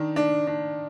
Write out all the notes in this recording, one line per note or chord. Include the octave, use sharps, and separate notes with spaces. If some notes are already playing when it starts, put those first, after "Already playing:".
Already playing: D#3 D4
D4
D4